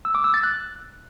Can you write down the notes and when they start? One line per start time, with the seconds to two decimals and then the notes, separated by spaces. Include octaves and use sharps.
0.05 E6
0.15 D6
0.24 E6
0.34 A6
0.43 F#6